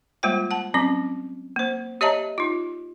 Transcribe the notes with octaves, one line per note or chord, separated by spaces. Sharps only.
G3 G#3 A#3 F4 C5 G5
F#5 A5
F#3 C4 C#4 D6
A#3 C5
G4 C#5 D#5 E5 A5 A#5
D#4 F4